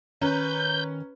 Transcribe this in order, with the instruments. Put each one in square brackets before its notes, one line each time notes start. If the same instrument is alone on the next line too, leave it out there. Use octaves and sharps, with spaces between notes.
[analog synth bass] D#3 [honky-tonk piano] C#4 A#5 [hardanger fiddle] B4 [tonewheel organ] G6